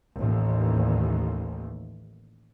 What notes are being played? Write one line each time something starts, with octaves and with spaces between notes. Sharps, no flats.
A1 D#2